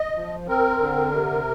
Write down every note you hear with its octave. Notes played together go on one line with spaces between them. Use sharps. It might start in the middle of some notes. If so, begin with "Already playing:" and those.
Already playing: D#5
F3
C4 A#4
D3
C3